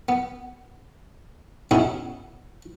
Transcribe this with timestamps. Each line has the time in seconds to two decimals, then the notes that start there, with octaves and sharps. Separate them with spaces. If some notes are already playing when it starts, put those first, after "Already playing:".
0.09 B3
1.71 B2 C#4 D#4 E4 G#4